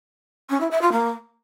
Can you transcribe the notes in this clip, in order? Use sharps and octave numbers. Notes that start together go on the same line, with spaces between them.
C#4
E4
E5
F4
A#3